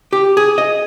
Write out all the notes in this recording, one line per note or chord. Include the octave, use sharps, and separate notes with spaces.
G4
G#4
D#5